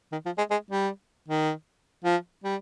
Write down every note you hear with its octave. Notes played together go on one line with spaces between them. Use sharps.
D#3
F3
G#3
G#3
G3
D#3
F3
G3